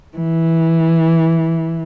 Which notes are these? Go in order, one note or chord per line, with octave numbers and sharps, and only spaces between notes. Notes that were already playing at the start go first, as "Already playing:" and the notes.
E3